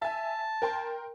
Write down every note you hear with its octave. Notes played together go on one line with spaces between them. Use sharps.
E5 G#5 A5
A#4 G5 C6